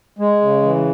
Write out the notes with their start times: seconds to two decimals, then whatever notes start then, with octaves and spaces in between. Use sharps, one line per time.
0.19 G#3
0.41 C#3
0.62 E3